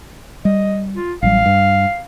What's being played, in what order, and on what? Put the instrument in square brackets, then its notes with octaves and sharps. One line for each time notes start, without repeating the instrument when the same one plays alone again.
[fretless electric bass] G3 [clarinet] D#5
[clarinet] F4
[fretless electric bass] A1 F#3 G3 [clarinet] F5
[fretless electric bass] G2